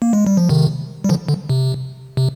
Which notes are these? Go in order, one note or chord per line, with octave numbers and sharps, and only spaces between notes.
A#3
G#3
G3
F3
C3 D#3
G3
D3 F3
D3
C3
C3